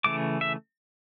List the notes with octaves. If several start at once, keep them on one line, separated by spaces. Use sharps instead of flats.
C#3 E3 A3 D6
E5